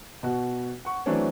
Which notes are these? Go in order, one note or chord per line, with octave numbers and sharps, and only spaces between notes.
B2 F#4
F#5 C#6
E3 F#3 A3 C4 D4 C#5